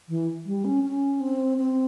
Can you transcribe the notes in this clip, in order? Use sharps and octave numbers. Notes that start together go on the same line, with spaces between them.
E3
G3
C#4
C#4
C4
C4